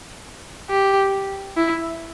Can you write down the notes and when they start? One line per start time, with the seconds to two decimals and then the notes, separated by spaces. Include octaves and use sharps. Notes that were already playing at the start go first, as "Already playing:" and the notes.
0.70 G4
1.57 E4